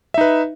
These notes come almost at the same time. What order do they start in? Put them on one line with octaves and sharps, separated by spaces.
E5 D#4 B4